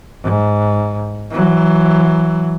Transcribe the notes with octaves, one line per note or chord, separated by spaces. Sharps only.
G#2
E3 F#3